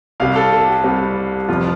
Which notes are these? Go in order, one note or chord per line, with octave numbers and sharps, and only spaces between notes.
C2 C3 G3 F5
A4
A4
G4
C2 C3 G3
F1 F2 F3 F4